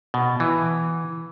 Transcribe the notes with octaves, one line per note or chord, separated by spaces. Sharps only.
B2
E3